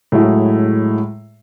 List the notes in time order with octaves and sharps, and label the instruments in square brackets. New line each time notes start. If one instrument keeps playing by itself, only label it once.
[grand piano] A2 F#3 G#3 E4 G#4